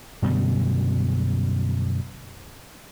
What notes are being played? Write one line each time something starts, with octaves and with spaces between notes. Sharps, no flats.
F#2 B2 D3 G3